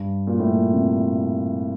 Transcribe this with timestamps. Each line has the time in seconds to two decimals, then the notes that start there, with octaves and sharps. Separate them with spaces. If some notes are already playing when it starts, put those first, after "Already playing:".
Already playing: G2
0.27 A#2
0.39 A2
0.51 A#2
0.73 C3